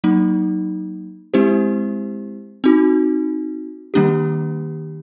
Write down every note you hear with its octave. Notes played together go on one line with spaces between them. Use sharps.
F#3 A#3 D#4
G#3 C4 E4 G4 C5
C4 D#4 F#4
D#3 G3 A#3 D4 G4